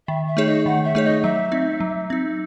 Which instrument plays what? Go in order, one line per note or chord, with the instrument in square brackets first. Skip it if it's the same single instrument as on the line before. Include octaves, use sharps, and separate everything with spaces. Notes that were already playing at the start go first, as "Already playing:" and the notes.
[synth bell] D#3 [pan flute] E5
[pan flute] E5
[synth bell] A3 D#4 G#4 C#5
[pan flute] D#5
[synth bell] D#3 [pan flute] F#5
[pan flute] E5
[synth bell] A3 D#4 G#4 C#5
[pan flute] D#5
[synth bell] F#3 [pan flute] E5
[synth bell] C4 D#4
F#3
C4 D#4